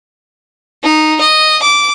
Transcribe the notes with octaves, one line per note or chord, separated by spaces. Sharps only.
D#4
D#5
D6